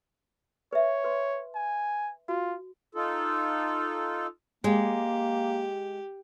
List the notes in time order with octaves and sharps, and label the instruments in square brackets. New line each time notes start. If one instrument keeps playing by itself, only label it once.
[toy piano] B4 E5 [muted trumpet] C#5
[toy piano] B4 C6
[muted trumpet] G#5
[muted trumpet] F4 [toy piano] F#4
[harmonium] D#4 F4 A4
[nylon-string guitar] G#3 [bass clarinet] A#3 [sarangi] G4